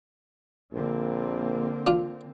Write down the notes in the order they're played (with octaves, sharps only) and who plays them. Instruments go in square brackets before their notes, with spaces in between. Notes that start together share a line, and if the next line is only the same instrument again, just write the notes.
[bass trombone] A#1 [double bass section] D3 A#3 C4
[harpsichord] D4 F4